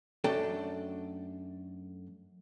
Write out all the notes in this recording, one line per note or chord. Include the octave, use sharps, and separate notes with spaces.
F#2 A3 D4 A4 G5